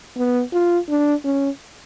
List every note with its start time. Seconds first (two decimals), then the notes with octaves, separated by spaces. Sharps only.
0.17 B3
0.53 F4
0.89 D4
1.24 C#4